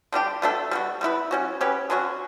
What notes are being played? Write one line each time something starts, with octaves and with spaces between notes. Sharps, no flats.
D3 G3 D4 G4
B2 A3 D4 A4
G3 B3 F#4
G3 B3 E4 B4
G3 C#4 F#4
F#3 C#4 G4 B4
D3 F#3 C#4 F#4